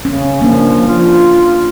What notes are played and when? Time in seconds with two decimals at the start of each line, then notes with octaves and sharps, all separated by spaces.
0.05 C#3 C#4
0.42 F3 A#3 D4
0.88 F4